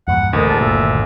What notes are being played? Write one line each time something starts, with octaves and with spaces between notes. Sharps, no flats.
E2 G2 A#2 F#5
A1 D2 A#4 D#5
A2 C3 G#3 A5
G1 D#2 A#2 E5